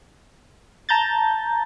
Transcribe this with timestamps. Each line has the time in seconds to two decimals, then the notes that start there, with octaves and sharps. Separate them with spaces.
0.89 A5 A#5 G6 A6